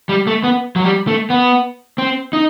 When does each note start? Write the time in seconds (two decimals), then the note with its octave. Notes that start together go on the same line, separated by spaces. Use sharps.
0.09 G3
0.27 A3
0.44 B3
0.76 F#3
0.83 G3
1.07 A3
1.30 B3
1.98 C4
2.33 D#4